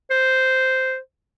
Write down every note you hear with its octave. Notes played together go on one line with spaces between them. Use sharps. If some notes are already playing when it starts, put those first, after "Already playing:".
C5